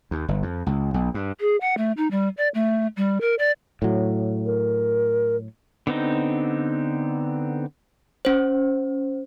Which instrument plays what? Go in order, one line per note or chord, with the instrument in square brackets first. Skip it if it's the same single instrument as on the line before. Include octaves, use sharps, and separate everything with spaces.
[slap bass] D#2
G1
F2
C#2
B1
G2
[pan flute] G#4
F#5
A3
D#4
G3
D5
A3
G3
A#4
D5
[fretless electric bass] A2 F#3
[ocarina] A#4
[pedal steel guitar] D3 B3 C4 D#4
[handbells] C#4 C5